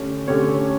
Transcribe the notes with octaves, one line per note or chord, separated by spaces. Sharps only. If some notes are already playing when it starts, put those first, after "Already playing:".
Already playing: D3 A3 C#4 G4
D3 A3 C#4 G4 C#5